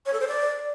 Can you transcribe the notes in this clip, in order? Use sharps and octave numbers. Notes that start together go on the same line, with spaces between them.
C#5
A4
C5
D5